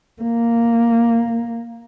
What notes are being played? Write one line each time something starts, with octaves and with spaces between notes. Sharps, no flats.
A#3